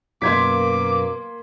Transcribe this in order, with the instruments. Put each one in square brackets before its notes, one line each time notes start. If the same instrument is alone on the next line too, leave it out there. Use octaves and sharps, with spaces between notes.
[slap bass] F#2 B2 [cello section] A#3 [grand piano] C6 G#6 B6 [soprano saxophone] D6